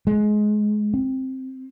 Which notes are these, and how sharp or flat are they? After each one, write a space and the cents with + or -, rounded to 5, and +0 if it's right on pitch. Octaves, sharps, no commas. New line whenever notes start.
G#3 +20
C4 +5